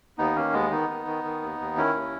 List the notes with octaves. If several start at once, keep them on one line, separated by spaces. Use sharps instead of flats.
D#2 B3 D#4
D#3 A#3 C#4
D#2 G#3 B3
D#3 B3 D#4
D#3
D#3
D#3
D#2
D#2
D#3 C#4 E4
D#2